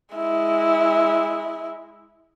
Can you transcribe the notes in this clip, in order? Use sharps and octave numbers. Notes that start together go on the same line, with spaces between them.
G#3 E4